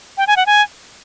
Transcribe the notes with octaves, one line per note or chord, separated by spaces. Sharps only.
G5
G#5
F#5
G#5